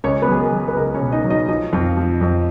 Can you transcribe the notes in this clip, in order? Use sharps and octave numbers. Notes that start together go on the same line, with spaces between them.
C#2 C#4 C#5
B3 B4
F#3 G#4
A#4
F#3
G#4
B4
C#2 A#4
C#4 C#5
B2
D#4 D#5
F#3
D#4 D#5
F3 D#4 D#5
F2 F4 F5
F3
F2